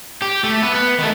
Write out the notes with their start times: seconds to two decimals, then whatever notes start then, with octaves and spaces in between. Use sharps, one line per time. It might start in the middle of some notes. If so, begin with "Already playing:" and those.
0.22 G4
0.43 A3
0.63 B3
0.74 B3
0.99 D#3 A3